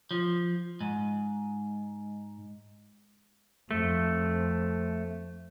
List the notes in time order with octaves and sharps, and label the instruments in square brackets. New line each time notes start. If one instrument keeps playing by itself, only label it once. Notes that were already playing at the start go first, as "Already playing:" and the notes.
[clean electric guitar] F3
G#2
[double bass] F2 [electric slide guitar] A3